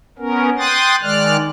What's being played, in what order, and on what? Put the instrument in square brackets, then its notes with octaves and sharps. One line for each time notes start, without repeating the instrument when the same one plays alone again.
[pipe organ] B3 C#4 A#4
G5 C6 D#6 F#6 A6
D#3 G#3 D5 F6 F#6